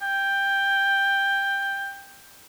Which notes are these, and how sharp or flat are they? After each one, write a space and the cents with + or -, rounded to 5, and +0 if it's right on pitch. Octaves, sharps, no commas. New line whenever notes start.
G5 +10